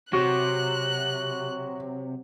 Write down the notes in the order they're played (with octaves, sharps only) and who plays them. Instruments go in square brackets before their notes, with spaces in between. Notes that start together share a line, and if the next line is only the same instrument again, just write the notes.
[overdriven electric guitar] C3 [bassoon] F#3 [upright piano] F#4 [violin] F#6